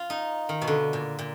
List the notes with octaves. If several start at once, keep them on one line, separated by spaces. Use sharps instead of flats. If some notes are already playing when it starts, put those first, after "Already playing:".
Already playing: F4
D#4
D#3
B2
D3
A#2
A#2